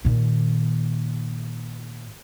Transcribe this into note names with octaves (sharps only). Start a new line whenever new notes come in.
A#2 D#3